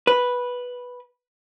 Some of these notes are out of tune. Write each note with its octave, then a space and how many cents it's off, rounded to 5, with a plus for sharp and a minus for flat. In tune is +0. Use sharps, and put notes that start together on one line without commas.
B4 -5